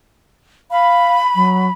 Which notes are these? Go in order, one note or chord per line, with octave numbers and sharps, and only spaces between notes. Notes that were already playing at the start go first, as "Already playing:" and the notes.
F5 B5
F#3